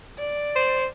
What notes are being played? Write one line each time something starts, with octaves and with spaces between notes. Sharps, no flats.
D5
C5